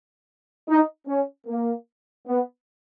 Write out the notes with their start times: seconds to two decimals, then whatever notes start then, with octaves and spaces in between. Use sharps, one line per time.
0.68 D#4
1.07 C#4
1.47 A#3
2.26 B3